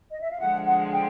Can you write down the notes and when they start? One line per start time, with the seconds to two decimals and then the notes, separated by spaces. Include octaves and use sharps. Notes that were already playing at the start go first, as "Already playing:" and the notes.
0.11 D#5
0.21 E5
0.31 F5
0.40 D3 F3 G#3 F#5
0.66 F#5
0.93 G5